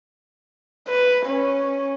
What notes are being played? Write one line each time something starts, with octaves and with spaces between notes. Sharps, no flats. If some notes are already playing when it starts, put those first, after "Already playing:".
B4
C#4